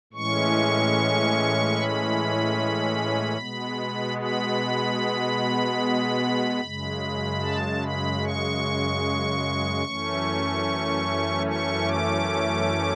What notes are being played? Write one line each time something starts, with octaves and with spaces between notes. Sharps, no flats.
A2 E3 G#3 C#4 C#6
B5
B2 G#3 B3
B5
F#2 C#3 G#3
A5
B5
C#6
F#2 E3 A3 C#4
C#6
D6